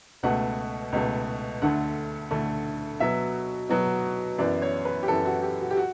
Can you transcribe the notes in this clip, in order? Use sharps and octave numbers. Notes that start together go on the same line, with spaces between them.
C#2 B2 A3 F#5
C#2 B2 A3
D2 D3 A3 F#5
D2 D3 A3
B2 F#3 B3 E5
B2 F#3 B3
F#2 E3 B3 D5
C#5
B4
G4
F#2 E3 B3 A4
F#4
G4
F#4
G4
F#4